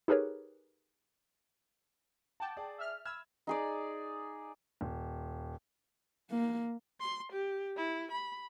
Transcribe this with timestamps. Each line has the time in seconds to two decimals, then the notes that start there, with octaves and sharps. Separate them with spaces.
0.08 D#4 G4 G#4 A#4 B4 C#5
2.40 F#5 G5 A5 D6
2.57 G#4 D5 D6
2.78 E5 F6
3.05 B5 E6 F6 G#6
3.47 D#4 G#4 D5
4.81 D#1
6.30 A#3
7.00 C6
7.33 G4
7.77 E4
8.12 B5